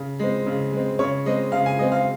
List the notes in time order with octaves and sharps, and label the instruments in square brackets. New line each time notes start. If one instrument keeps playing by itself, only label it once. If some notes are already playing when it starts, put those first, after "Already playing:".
Already playing: [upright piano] C#3
G#3 C4
C#3
G#3 C4
C#3 C#5
G#3 C4 D#5
C#3 F5
G#5
G#3 D#5
C4
F5